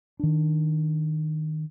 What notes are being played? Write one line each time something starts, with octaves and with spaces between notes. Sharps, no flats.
D#3 D4